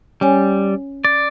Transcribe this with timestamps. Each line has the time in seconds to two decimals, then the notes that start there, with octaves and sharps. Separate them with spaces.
0.21 G3 C#4 C#5 G#5
1.05 D5